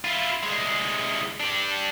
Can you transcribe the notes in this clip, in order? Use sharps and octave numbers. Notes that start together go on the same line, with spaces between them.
E4 F4
C2 G#3
D4 G4